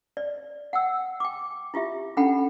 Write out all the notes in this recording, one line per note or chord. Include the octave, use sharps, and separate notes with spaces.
D5
F#5 G5 E6
G5 D6
E4 F4 G4 E5
C#4 D4 A4 F#5 G5 B5